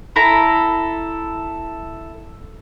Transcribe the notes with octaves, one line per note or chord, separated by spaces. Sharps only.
E4 A4 A#5